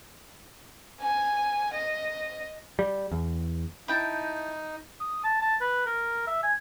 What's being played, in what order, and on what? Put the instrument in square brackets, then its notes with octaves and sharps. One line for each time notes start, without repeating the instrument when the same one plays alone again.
[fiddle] G#5
D#5
[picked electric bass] G3
E2
[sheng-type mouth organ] D#4 [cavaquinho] E4 G5 A5
[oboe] D#6
A5
A5
B4
A#4
E5
G#5